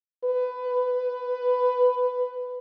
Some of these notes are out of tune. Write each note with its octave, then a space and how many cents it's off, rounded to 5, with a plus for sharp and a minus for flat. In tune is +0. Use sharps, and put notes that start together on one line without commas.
B4 +15